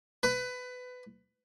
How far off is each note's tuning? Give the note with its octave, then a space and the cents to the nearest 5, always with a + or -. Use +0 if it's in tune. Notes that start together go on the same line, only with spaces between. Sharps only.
B4 +20